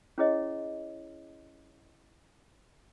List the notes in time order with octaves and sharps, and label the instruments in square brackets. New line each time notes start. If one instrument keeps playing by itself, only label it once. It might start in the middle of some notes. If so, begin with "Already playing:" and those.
[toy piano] C#4 E4 G#4 C#5 D#5